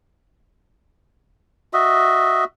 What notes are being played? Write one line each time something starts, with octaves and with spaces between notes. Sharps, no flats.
F#4 D#5 E5